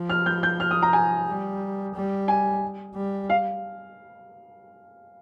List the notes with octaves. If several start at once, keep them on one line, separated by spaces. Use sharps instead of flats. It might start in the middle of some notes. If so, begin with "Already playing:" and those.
Already playing: F3
F6
G6
G6
F6
D#6
A#5
G#5
G3
G3
G#5
G3
F5